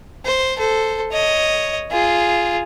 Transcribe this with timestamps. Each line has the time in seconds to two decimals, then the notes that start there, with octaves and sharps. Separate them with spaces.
0.25 C5
0.57 A4 C5
1.12 C#5 D#5
1.91 F4 G#4